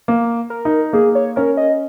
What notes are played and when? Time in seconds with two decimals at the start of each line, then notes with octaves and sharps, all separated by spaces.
0.08 A#3
0.50 A#4
0.65 D#4
0.93 A#3 G#4
1.15 C#5
1.36 C#4 A#4
1.57 D#5